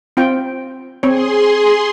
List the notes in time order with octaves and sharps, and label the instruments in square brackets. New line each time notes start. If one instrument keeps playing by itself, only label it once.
[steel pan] C4 F4 G5
[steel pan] C4 C#5 [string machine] G#4 C6